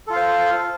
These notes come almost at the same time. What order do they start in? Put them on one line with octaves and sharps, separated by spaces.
A4 F4 F5 C5